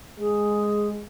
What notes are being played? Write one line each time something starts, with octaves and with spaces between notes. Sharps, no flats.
G#3 G#4